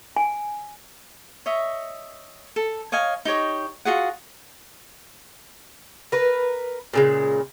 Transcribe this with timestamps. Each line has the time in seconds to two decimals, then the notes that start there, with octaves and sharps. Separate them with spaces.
0.16 G#5
1.46 C#5 D#5 E5
2.56 A4
2.92 C#5 D#5 F5 G#5
3.25 D#4 G4 C#5 D#5
3.85 F4 F#4 G#4 F#5
6.12 A#4 B4
6.94 A#2 C#3 G#3